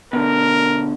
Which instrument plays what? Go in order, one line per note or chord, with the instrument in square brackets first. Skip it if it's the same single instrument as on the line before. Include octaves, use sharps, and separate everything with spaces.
[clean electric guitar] B2 D3 [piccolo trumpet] A#4